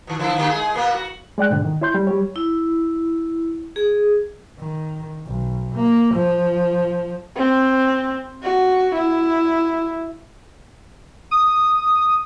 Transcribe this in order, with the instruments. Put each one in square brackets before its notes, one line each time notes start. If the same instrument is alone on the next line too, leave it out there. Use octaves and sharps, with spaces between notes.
[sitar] B2 D#3
D3 F3 E4
D3 A#3 G4
G#3 G#4
B2 A#3 B3
F#4
[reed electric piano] G#3 D5 G5 F#6
G#2 B2 D3
D#3
E4 C#5 C6 G6
G3
G3 G4 C#5
[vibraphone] E4
G#4
[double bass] D#3
B1
A#3
F3
[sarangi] C4
F#4
E4
[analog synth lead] D#6